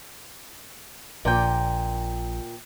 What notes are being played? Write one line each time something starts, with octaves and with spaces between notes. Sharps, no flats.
A#1 A#2 G5